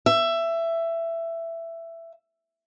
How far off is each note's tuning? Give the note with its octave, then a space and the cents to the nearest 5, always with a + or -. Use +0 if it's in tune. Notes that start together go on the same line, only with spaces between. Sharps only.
E5 +15